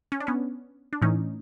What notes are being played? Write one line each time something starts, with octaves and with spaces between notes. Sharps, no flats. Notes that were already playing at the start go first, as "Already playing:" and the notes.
C#4
D4
B3 C#4
D4
A2 E3 C#4 D#4